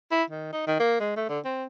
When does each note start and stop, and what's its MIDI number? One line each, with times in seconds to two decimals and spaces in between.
0.12 0.23 64
0.30 0.49 51
0.53 0.67 63
0.67 0.75 51
0.80 0.98 58
1.00 1.14 56
1.17 1.27 57
1.29 1.39 50
1.45 1.65 60